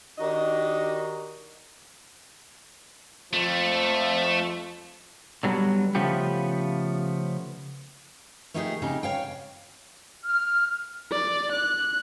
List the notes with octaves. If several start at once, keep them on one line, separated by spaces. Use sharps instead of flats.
D#3 D4 D#4 F#4 G4 D#5
F2 F3 A3
D3 F#3 G3 B3
C#3 F3 A3 B3 G4
A3 A#3 D#4 E4 G4 G#4
F2 C#3 D#4 G4 A4
C#5 F5 G5
F6
D5
F#6